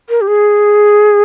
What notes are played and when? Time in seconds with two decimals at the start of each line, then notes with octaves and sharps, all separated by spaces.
0.09 A#4
0.21 G4
0.27 G#4